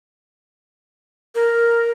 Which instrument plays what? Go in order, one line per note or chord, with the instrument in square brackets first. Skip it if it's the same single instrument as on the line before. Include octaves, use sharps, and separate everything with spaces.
[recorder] A#4